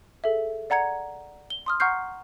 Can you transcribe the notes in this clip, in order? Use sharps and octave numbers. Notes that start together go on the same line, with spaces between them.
G#4 A4 E5
D5 F#5 A#5 G#6 C#7
G7
C6 D#6 F6
F#5 A#5 C#6 F6 G6 C7